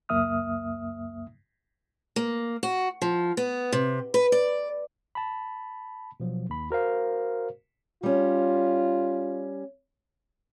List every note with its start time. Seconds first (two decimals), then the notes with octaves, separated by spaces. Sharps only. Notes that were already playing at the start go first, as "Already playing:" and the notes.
0.09 C#2 F#2 A#3 E5 D#6 F6
2.16 A#3
2.63 F#4
3.02 F3
3.37 B3
3.72 C3
4.14 B4
4.32 D5
5.15 A5 B5
6.20 B2 F3 F#3
6.49 D#2 B5
6.71 F#4 A#4 C5 F5
8.03 G3 C#4 F4